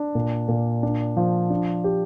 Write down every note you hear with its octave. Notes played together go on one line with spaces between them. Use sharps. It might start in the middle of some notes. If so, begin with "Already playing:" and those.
Already playing: D4
A#2
A#2
D4
F3
D4
G4